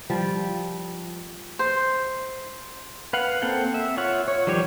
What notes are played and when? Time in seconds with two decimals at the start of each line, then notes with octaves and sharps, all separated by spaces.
0.10 F3 G3
1.59 C5
3.13 B4 F5 F#5
3.42 A#3 C4 A4 F#5 G5
3.74 E5
3.97 F4 C#5 F5 F#5
4.28 C#5
4.47 D#3 F3 G3 G4 C#5